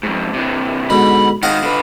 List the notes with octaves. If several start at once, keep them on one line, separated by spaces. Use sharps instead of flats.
F2 G#2
C3 E3
G#2 B2 D3 B5
G#2 D#3 D#5 F5 F#5
D3 B4